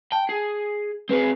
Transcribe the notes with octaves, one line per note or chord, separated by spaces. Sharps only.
G5 A5
G#4
C4 G#4 B4